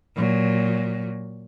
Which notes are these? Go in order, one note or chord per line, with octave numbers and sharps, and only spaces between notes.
A#2 F#3